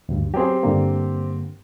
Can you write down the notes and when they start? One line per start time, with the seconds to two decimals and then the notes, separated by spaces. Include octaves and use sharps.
0.09 D2 G2
0.34 F#3 C4 G4 G#4
0.63 G2 D3 A#3